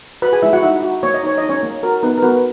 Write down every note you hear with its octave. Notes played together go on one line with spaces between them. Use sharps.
F#4 B4 B5
G#4 G#5
G#3 E4 E5
F#4 F#5
D#4 E4 E5
F#4
A#3 C#5
D#5
D#4 C#5
D#4 D#5
C#4 C#5
A#3
F#4 A#4
B3 D#4 B4
A#4
B3 F#4 B4